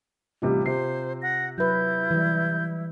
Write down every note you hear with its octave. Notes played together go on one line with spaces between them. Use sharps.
A1 C3 G3 F4
C3 C5 C7
F#5 A#6
F#3 E4 B4 G6
E3 G3